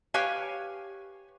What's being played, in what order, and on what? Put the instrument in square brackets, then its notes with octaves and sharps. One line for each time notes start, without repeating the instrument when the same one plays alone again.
[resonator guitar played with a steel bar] G4 B4 C#5 F5 G#5